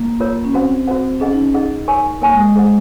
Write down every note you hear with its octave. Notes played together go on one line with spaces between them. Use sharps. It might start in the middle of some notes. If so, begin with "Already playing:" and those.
Already playing: A#3
F4 A#4 C#5
C#4
C4 F#4 C5 F#5
F#4 C5 F#5
C#4 G#4 D#5 F#5
D#4
C#4
D#4 G#4 D#5 F#5
A#4 C#5 G#5 C#6
A#3 A#4 C#5 G#5 C#6
G#3
G#3
G#4 C5 F#5